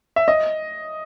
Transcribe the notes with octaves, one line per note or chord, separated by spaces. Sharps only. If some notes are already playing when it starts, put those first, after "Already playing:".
E5
D#5